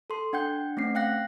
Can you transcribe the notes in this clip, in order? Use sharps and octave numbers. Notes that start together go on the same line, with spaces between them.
A4 C6
D4 F#5 G5 G6
A3 C4 C#4 C7
F5 G5 F#6 A#6